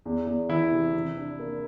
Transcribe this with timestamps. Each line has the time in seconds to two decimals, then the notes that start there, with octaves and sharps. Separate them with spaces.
0.05 E2
0.27 E2
0.49 E3 E4
0.72 C3
0.94 C3
1.17 D4
1.39 A#3